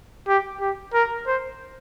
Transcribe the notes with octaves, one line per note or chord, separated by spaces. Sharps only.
G4
G4
A#4
C5